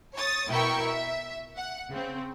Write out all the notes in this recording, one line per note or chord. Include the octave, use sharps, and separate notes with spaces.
C#5 D#6 A6
B2 E4 A#4 G5 C#6 E6
E5
F#5
C#3 C4